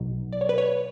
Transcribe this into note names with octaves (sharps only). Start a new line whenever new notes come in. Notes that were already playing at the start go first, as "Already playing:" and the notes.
Already playing: B1 B2 F#3
D5
C#5
B4
C#5